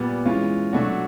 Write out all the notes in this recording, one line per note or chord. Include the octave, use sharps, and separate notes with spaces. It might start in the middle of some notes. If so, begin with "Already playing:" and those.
Already playing: A#2 G3 B3
E3 G#3 C#4 F4
B2 F#3 A3 D4 F#4